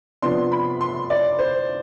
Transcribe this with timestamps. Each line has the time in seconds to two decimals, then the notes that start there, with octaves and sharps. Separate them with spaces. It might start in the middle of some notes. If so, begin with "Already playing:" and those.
0.22 C3 F3 B3 D4 C6
0.52 B5
0.81 C6
1.10 D5
1.39 C5